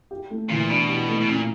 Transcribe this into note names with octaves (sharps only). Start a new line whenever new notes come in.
G4
A3
A#2 E3
B2 D4
G4
A3
B2
A#2 C#4